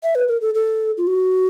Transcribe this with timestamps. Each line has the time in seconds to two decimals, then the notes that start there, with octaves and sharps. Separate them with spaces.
0.03 E5
0.15 B4
0.28 A#4
0.41 A4
0.55 A4
0.98 F4
1.07 F#4